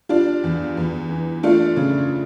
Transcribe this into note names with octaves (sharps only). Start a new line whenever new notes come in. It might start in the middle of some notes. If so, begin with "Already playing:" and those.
G3 D4 F4
E2
E2
E3
A3 D4 F4
C#3